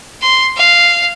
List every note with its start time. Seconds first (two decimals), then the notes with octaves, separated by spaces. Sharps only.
0.22 C6
0.57 F5